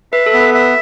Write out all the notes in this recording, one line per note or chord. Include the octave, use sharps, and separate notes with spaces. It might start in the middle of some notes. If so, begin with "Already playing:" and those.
B4 E5
A4
B3
B4
E5